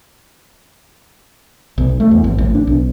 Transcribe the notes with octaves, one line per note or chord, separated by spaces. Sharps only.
B1
A3
E2
G#1
A1
D4
B1